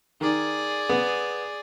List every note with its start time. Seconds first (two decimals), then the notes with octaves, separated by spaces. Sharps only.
0.21 D#3 G#4 D5
0.89 B3